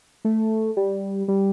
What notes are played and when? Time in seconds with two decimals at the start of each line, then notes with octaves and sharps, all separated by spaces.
0.25 A3
0.77 G3
1.28 G3